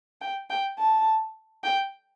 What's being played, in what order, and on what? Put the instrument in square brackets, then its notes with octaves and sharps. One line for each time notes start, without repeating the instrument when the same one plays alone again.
[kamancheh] G5
G5
A5
G5